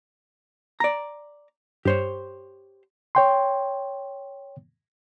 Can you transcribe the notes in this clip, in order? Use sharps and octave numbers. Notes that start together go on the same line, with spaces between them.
D5 A#5
G2 G4 C5 C#5
C#5 G5 C6